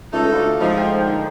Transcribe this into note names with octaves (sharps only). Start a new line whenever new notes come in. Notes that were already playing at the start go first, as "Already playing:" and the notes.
C#2 A3 D#4 A4
D2 F4 D6
G#2 F3 D#4 D#5
G5
A#2 D3